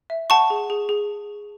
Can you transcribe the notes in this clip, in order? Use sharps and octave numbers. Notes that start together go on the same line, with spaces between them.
E5
F#5 A5 C#6
G#4
G#4
G#4